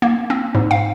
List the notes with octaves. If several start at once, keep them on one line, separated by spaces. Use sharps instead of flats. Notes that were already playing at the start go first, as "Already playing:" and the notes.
A#3
C4
G#2
F5